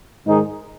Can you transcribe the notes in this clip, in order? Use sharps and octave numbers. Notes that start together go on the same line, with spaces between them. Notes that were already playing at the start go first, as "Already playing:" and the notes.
G#2 D#3 G#3 D#4 G#4